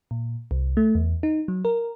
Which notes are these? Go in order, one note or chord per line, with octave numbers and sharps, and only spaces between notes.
A#2
C2
A3
E2
D#4
F#3
A#4